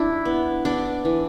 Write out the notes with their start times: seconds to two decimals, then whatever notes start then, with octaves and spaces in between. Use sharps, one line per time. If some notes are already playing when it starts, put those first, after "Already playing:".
Already playing: D4 E4
0.25 B3
0.65 B3 D4
1.05 E3